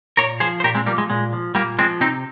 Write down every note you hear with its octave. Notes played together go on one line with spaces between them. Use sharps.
A#2 A#4 C#5
F3 G#4 C5
C5
A#2 G4 A#4
G#3 C4
F3 G3 A#3
G#3
A#2 G#3
F3
A#2 G3 A#3
F3 G#3 C4
C3 C4 D#4